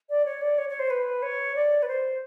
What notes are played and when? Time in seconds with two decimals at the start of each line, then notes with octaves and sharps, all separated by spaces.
0.10 D5
0.25 C#5
0.41 D5
0.58 C#5
0.69 C#5
0.79 C5
0.90 B4
1.22 C#5
1.56 D5
1.83 B4
1.88 C5